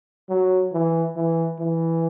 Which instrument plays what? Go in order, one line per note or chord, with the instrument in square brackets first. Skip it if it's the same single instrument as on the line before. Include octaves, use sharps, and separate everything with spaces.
[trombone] F#3
E3
E3
E3